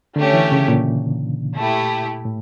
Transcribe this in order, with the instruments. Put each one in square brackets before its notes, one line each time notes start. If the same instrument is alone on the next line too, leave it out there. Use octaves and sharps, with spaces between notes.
[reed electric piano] D3 [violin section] A3 C#4 G4 C#5
[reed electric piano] E3
C#3
A#2
[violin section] A3 E4 G4
[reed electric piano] A2